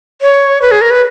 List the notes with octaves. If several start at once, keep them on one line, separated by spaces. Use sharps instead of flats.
C#5
B4
G#4
A#4
B4